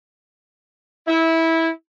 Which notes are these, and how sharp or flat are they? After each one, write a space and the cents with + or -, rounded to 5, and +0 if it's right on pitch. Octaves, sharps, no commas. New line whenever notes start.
E4 -15